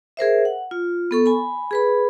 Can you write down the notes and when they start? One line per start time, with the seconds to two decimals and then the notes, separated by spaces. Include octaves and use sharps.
0.17 G#4 A#4 C5 E5
0.45 F#5
0.71 F4
1.11 B3 A4 C#6
1.26 G#5 B5
1.71 G#4 B4 B5